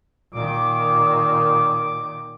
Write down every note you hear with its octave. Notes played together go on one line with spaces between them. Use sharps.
A#2 D#3 D6